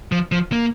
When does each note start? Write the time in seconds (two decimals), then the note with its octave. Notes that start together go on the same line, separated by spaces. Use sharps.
0.12 F3
0.32 F3
0.52 A#3